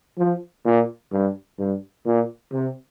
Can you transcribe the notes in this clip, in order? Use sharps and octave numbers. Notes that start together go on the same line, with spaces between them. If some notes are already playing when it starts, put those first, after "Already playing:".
F3
A#2
G2
G2
A#2
C3